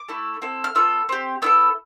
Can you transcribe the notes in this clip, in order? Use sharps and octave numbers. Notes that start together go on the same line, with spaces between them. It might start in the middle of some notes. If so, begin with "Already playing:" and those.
Already playing: D6
A3 E4 A4
C4 E4 A4
F6
B3 F4 A4 E6
C4 G4
B3 E4 A4 E6